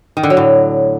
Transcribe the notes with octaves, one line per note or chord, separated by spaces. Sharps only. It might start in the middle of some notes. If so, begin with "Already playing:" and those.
D#3
D3
F#3
A2